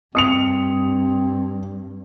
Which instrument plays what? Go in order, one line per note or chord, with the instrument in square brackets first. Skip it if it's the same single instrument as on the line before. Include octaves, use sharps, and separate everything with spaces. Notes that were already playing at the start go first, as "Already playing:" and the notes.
[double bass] G2 [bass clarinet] C4 [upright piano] D#6 C#7 F7